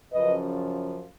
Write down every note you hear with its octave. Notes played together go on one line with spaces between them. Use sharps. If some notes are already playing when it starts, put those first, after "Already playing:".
F#2 C#3 F3 B4 D#5